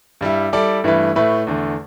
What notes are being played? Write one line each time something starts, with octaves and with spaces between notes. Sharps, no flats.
G2 G3 E4
G3 E4 A4 D5
G2 E3 A3 E4 B4
A2 A3 E4 B4
E2 D3 A3